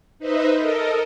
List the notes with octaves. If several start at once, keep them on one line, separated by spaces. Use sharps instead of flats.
D#4 B4 C5 D#5 E5
A4 A#4 D#5